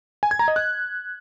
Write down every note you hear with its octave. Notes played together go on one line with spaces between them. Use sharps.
G#5
G#6
A#5
D#5
F#6